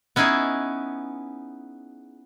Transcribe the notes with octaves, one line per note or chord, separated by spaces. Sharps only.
B3 C#4 D#4 E4 G#4